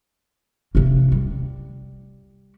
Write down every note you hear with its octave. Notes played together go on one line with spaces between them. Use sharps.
C3 A#3
G3